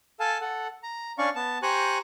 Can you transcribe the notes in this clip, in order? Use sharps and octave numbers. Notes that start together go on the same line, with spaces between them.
A4 F5 G#5 A5
A4 F#5
A#5
C#4 D4 D5 F5 C#6
B3 A5
G4 C5 G#5 A#5 C#6 F#6